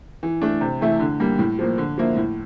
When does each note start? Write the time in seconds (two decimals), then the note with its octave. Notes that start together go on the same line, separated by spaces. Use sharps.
0.23 E3
0.42 A3 D4
0.61 C3
0.81 E3 A3 E4
1.00 D3
1.20 G3 A#3
1.39 A2
1.59 F3 A#3
1.78 D3
1.98 F3 A#3 E4
2.16 A2